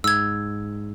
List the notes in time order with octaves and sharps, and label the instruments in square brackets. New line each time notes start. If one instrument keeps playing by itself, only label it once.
[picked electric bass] G#2 [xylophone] E6 G#6